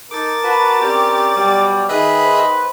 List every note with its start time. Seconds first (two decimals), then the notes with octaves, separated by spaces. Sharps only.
0.11 D#4 A4 A#4 D6 A6
0.43 F#4 B4 A5
0.81 C4 C#4 G4 D5
1.36 B2 F#3 G3
1.89 D#3 G#4 B4 D#5 E5 F#6
2.24 C5